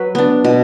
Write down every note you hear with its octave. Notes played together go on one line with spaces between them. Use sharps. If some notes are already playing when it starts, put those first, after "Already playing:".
Already playing: F#3 B4
B3 D4
B2